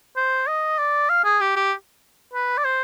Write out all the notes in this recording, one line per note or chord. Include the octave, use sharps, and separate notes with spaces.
C5
D#5
D5
F5
G#4
G4
G4
B4
D5
C5